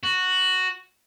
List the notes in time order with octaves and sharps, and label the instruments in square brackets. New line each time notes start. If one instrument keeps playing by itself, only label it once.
[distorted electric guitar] F#4